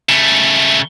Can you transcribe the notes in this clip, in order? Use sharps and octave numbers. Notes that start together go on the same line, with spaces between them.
C#3 A3